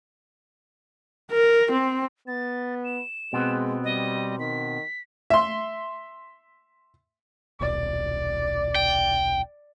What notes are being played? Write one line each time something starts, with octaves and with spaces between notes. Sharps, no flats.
A#4
C4
B3 A6
E7
B2 G#3 B3 C4
G3 D#5
D#3 B6
E5 C6
D#1 B1 D5
G5